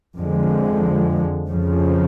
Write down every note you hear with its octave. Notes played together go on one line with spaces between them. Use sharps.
F2 D3 F3 G#3
F2 C#3 F3